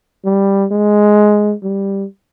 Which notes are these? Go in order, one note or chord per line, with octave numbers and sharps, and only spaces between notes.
G3
G#3
G3